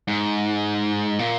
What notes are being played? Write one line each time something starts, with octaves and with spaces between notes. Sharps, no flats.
G#2
A#2